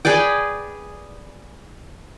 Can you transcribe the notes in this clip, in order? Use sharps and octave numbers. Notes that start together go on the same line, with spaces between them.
G#4 B4 D5 G5